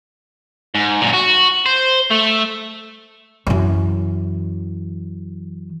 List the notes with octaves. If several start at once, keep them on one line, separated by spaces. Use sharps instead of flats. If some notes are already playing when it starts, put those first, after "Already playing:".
G#2
F#2 A#2
F#4
C5
A3
F#2 E3